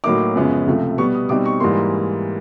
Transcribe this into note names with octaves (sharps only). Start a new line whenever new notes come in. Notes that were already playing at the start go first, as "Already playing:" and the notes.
A2 F#3 A#3 D#4 D6
F#2 C#3 F3 G#3 B3
C#2 C3 F3 A3
B2 G3 B3 C#6
D#6
B2 G3 C4 D#4 D6
C#6
G#2 E3 G3 A#3 C6